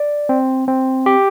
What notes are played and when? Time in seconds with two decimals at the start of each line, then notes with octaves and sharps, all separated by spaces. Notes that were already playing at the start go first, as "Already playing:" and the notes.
Already playing: D5
0.29 C4
0.68 C4
1.06 G4